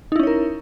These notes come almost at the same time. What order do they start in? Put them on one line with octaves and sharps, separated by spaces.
D#4 E4 C#4 C#5 A#4